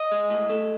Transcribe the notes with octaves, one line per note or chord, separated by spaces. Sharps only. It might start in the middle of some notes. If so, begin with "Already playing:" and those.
Already playing: D#5
G#3
A2
A3